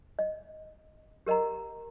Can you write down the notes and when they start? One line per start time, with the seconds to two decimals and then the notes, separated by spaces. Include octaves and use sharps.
0.19 D#5
1.26 G4 A#4 D#5 F#5 A#5